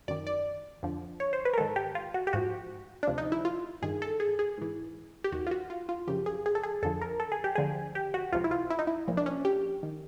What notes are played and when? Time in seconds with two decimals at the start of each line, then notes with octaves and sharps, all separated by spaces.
0.08 F#2 D#3 D5
0.27 D5
0.83 F2 D3 F3
1.20 C#5
1.33 C5
1.45 B4
1.53 A#4
1.58 G#2 D#3 A4
1.76 G4
1.95 F4
2.14 F#4
2.27 G4
2.33 G#2 F3 F#4
3.03 D2 C3 F3 D4
3.18 D#4
3.32 E4
3.45 F4
3.82 G2 D#3 G#4
4.02 A4
4.20 G#4
4.39 G#4
4.58 G#2 E3
5.24 G4
5.32 D#2 D#3 F#4
5.47 F4
5.51 F#4
5.70 F4
5.89 F4
6.07 F#2 C#3 F3 G4
6.26 G#4
6.46 G#4
6.55 A4
6.63 G#4
6.82 F2 D3 F3 A4
7.01 A#4
7.20 A4
7.32 G#4
7.44 G4
7.55 D2 D3 F3 G#4
7.95 G4
8.14 F#4
8.33 C#2 C3 F3 F4
8.44 E4
8.51 F4
8.70 E4
8.79 D#4
8.87 E4
9.08 C2 A#2 F3
9.17 D4
9.26 C#4
9.45 G4
9.83 D#3